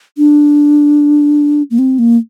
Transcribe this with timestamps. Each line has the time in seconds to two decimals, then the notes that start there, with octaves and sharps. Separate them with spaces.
0.18 D4
1.71 A#3
1.79 C4
1.99 A#3